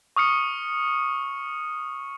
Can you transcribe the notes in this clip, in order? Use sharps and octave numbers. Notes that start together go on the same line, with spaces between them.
C#6 D#6 F6 C#7